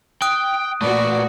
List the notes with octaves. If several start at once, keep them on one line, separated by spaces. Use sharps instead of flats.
G5 D#6 F#6 D7
A#2 A3 F#4 B4 D5